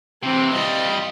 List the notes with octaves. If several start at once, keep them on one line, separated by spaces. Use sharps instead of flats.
C3 E3 C4
G3 F4 D#5